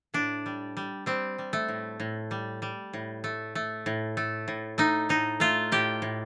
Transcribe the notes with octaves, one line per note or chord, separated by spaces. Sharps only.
A2 D4
G3
G3
G3 C4
G3
A3
A2
A2
G3
G3
A2
A3
A3
A2
A3
A2
A3 D#4
A2 D#4
A3 F4
A2 G4
A2